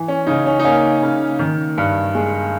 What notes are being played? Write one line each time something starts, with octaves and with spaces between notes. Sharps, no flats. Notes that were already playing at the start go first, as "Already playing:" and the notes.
Already playing: E3
C#4
C#3 D#4
C#4
D#4
A#3 C#4
C#3
D#3
G2
G#3